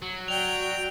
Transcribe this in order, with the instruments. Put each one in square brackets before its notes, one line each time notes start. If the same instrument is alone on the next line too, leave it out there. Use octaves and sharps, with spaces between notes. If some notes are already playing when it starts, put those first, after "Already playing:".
[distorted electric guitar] F#3
[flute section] F#4 D5 [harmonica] G5 [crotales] F7